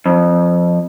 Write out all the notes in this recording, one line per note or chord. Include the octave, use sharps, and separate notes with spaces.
F2